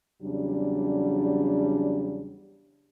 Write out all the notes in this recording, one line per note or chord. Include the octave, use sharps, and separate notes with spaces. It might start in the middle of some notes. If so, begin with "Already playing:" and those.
E2 C#3 F#3 G3 D4